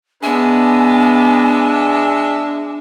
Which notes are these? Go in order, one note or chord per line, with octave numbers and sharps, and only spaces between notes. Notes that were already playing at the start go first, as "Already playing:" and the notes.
G#3 B3 D4 E5 G#5